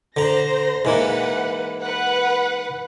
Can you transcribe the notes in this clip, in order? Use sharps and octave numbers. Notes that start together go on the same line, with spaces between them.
D3 C5 A#5 A#6
G#2 E3 A#3 B4 F#5
B4 F#5